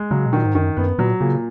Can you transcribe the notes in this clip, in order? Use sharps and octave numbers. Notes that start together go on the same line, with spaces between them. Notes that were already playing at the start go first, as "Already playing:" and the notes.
Already playing: G#3
C#3 F#3
B2
A#2 D#3
G#2
F#2 D#3
F#2 B3
A#2 F#3
A#2 C#3